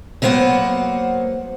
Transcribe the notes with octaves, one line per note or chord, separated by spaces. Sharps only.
F#3 A#3 B3 C5 F#5